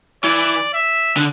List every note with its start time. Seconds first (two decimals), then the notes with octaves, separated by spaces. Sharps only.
0.24 E3 D5
0.74 E5
1.17 D3